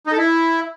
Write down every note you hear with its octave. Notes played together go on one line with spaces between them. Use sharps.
D#4
A4
E4